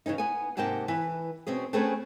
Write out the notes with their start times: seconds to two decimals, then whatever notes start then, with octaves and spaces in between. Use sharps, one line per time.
0.06 C#3 E3 C#4 D#4
0.18 B3 G#5
0.57 G#2 C3 A#3 F#5 G5 A5
0.88 E3 B4
1.47 B2 C4 C#4 G#4
1.73 A3 C4 C#4 G#4 A4 B4